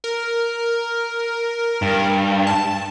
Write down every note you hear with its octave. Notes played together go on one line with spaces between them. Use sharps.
A#4
G2
A5